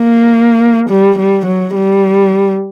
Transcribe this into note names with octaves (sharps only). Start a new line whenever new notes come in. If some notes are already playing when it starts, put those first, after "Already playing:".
Already playing: A#3
G3
G3
F#3
G3